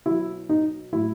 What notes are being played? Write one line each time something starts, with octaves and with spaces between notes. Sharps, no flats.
B2 F#3 E4
D#4
A2 F#3 E4